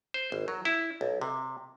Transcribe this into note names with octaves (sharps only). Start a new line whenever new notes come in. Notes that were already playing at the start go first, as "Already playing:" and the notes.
C5
G#1
F#3
E4
B1
C3